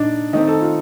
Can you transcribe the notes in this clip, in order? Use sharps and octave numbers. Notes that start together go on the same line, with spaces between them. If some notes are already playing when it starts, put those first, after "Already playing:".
Already playing: A#2 D4 D#4
D#3 A3 C4 D#4
A4
F4